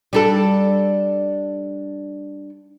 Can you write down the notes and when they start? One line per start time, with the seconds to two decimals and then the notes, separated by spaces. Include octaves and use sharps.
0.13 G3 D4 A4